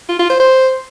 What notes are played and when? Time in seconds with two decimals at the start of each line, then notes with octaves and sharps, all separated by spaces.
0.09 F4
0.19 F4
0.30 C5
0.40 C5